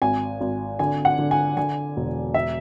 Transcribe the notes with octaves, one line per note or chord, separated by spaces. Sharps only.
G#1 G#5
G#1
D3 G#5
F#5
D3
G#5
D3 G#5
E1
E5